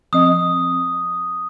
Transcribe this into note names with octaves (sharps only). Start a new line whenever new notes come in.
F3 C4 D#5 D#6